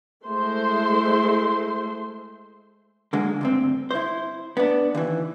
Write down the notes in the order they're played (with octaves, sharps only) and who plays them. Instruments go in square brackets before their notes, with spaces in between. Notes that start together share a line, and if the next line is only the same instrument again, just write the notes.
[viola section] G#3 A3 E4 C5 C6
[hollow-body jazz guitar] D3 F#3 G#3 A#3
D2 G2 C4
E4 C5
B3 D4
D#2 E3